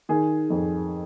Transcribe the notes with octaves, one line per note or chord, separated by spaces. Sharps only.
D#3 G#4
F2